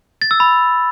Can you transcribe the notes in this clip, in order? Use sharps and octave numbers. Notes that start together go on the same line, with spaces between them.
A6
E6
B5